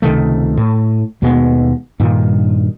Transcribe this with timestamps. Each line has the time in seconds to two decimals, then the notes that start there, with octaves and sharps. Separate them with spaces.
0.02 C#2 C3 D#3 A3
0.57 A2
1.22 D#2 B2 G#3 B3
2.00 G2 A#2 D#3